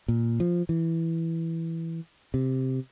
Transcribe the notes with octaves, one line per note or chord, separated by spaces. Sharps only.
A#2
F3
E3
C3